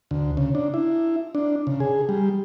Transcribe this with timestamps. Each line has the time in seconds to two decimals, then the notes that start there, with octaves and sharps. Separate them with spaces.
0.11 D2
0.37 C#3
0.55 D4
0.74 E4
1.35 D4
1.67 C#3
1.80 G#4
2.09 G3